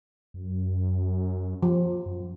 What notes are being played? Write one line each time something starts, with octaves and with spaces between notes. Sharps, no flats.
F#2
F3
F#2